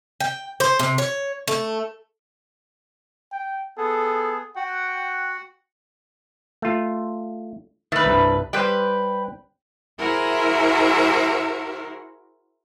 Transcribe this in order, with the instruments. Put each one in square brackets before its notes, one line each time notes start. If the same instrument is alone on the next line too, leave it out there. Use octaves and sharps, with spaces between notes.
[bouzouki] G5
C5
C3
C#5
A3
[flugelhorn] G5
[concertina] B3 G#4 [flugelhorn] A4
[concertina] F#4 F#5 [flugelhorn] G5
[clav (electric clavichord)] A3 F4
[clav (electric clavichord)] D#3 [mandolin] A3 B4
[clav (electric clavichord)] C2 G2
[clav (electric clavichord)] G3 G4 C5 [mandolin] B4 G5
[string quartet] E4 F#4 G#4 A#4 C5 E5